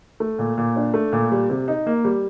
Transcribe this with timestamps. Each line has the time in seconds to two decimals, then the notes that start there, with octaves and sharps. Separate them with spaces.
0.20 A3
0.39 A#2
0.58 A#2
0.76 D4
0.94 A3
1.13 A#2
1.32 G3
1.50 C3
1.68 D#4
1.87 A#3
2.05 G3